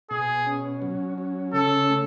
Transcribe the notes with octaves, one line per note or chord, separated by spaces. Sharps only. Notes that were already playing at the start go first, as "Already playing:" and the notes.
B2 G#4
C#4
F#3
C#4
C#3 A4
A3